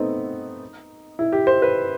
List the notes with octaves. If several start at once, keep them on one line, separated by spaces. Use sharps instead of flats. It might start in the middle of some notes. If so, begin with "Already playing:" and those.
Already playing: A3 B3 C4 D#4
E4
G4
C5
B4